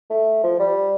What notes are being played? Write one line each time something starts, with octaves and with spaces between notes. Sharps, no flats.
A3
F3
G3